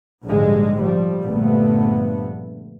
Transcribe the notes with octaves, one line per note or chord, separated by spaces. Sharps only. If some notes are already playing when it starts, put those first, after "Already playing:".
A#1 G#2 D3 G3 G#3
F3 G3
A#1 G2 A#2 D3 A3 B3